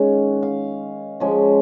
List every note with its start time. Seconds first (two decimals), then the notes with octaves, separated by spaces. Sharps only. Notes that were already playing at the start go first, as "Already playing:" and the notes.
Already playing: D#3 G#3 C#4 F#5
0.43 F5
1.20 F3 G#3 C#4